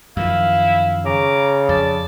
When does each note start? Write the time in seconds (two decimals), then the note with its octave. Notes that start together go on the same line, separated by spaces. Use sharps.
0.17 F#2 D#3 F3 E4 F5
1.05 C#3 A#5 D6
1.69 F2 D5 A5